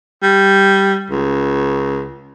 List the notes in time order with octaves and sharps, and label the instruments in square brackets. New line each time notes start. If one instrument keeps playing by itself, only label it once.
[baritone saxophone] G3
C#2